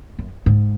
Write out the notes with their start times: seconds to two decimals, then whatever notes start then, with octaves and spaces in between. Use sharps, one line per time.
0.19 F#2
0.46 G#2